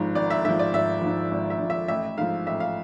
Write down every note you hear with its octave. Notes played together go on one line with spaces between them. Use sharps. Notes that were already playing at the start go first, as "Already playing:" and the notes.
Already playing: G#1 G#2 F3
G#1 D5
E5
G#2 F3 E5
D5
G#1 E5
G#2 F3
G#1
E5
G#2 F3
E5
A1 E5
G#2 F3 F5
A1 E5
F5